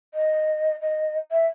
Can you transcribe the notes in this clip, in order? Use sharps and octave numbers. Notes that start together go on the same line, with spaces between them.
D#5
D#5
E5